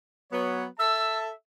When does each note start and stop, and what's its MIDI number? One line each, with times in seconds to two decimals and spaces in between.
0.32 0.64 54
0.32 0.64 59
0.32 0.64 73
0.79 1.28 69
0.79 1.28 76
0.79 1.28 81
0.79 1.18 88